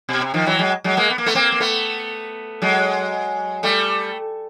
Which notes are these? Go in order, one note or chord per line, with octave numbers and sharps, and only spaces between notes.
B2
C3
D#3 F3
E3 F#3
F#3 G#3
F#3 G#3
G#3 A#3
B3
A#3
A3 B3
A#3 C4
A#3
A3 B3
F#3 G#3
G3 A3